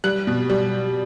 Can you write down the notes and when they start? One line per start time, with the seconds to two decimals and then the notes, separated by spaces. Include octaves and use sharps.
0.04 G3 F#6
0.27 B2
0.50 G3